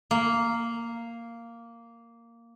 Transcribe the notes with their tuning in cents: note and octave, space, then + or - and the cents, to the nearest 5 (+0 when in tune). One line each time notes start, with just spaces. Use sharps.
A#3 -5